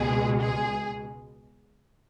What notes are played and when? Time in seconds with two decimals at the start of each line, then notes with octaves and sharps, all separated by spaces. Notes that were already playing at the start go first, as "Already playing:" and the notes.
Already playing: C#2 B2 G#3 G#4
0.40 G#4